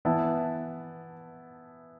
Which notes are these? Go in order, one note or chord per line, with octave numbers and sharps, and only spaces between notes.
E3 B3 E4 A5